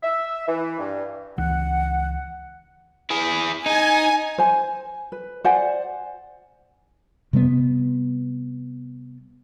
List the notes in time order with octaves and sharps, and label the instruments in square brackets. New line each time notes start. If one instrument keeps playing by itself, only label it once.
[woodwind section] E5
E3
G2
[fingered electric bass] C#2 E3 [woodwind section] F#5
[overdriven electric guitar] E4 G#4
[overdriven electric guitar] D#4 [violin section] G#5
[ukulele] C5 G#5
B4
C5 D5 F#5 G#5
[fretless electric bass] C3 G3 A3 B3